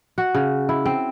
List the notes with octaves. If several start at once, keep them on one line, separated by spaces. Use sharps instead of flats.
F#4
C#3
E4
C4